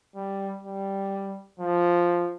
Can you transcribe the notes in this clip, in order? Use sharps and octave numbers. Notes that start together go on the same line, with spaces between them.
G3
G3
F3